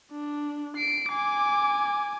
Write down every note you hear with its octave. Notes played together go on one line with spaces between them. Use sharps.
D4
C7 D7
G#5 D6